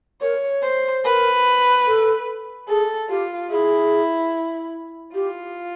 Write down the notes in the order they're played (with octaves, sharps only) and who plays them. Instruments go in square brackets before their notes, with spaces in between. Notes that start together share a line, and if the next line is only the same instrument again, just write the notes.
[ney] A#4 [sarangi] C#5
[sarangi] C5
[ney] A#4 [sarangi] B4
[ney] A4
[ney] G#4 [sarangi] A4
[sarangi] F4 [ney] G4
[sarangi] E4 [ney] G#4
[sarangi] F4 [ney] G4